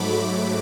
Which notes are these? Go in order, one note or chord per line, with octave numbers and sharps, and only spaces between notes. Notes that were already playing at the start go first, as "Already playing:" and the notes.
Already playing: G#2 F#3 A3 B5 D6